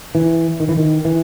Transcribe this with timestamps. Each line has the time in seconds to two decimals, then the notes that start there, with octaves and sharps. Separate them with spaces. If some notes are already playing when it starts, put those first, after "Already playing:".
0.15 E3
0.60 D#3
0.69 E3
0.77 D#3
1.05 E3